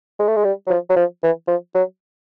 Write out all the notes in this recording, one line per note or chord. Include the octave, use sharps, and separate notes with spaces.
G#3
A3
G#3
G3
F#3
F3
F#3
F3
E3
F3
F#3